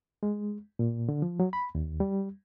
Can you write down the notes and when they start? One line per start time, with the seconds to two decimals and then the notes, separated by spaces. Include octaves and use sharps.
0.23 G#3
0.79 A#2
1.09 D3
1.22 F3
1.40 F#3
1.53 B5
1.75 D#2
2.00 G3